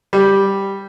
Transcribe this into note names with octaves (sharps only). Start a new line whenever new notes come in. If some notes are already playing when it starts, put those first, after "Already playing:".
G3